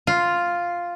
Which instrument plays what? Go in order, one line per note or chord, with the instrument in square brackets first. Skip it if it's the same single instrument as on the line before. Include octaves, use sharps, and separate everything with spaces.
[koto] F4